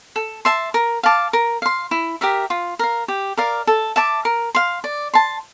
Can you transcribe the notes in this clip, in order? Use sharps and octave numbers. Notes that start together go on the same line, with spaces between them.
A4
E5 A5 C6
A#4
F5 A5 D6
A#4
F5 C6
E4
G4 A#4 E5
F4
A#4 F5
G4
A#4 D5 F5
A4
E5 A5 D6
A#4
F5 C6
D5
A5 C6